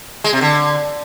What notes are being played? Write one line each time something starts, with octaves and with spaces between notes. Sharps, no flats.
G#3
C3
D3